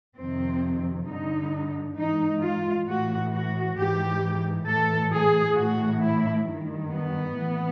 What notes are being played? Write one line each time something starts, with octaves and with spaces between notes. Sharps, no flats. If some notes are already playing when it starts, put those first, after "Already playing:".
F2 C3 D#3 C4
G2 D3 D#4
G#2 E3 D#4
F4
A2 E3 F#4
F#4
G#2 E3 G4
A2 E3 A4
G#4
A2 E3 F#4
E4
G2 D#3
B3
A2 E3